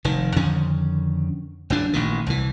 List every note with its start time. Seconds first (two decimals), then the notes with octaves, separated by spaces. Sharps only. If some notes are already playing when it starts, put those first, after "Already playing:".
0.05 F1 D#3
0.36 F2 D3 D#3 C#4
1.70 F#1 E2 D4
1.93 A1 A#2 D#3
2.27 C2 E3